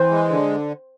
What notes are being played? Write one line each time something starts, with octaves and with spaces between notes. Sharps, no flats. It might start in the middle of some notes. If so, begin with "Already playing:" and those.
Already playing: E3 C5
G#3
D3